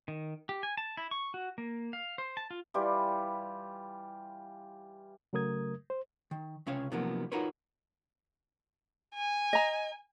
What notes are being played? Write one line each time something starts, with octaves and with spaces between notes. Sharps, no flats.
D#3
G4
G#5
A5
E4
C#6
F#4
A#3
F5
C5
A5
F4
E3 G3 F4 G4
C#3 F#3 A3 A#4 D#6 G#6
C5
D#3
C#2 C3 C#4 C#5 F5
C3 D#3 F3 F#3 A#3 B3
D#4 F4 F#4 A#4 B4 C#5
G#5
D#5 A#5